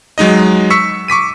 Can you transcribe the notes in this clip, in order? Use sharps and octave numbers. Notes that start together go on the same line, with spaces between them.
F#3 G#3 D#4 D#5
C#6 E6 B6 C#7
C#6 D6 B6 D#7